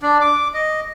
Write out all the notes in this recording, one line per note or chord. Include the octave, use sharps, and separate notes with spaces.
D4
D6
D#5